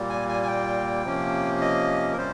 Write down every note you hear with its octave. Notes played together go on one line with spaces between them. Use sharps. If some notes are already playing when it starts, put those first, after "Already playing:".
Already playing: A#2 G3 A#3
G#5
G#5
G#5
G5
C3 F3 A#3 C#4
D#5
A#4
C3 G3 C#4 C5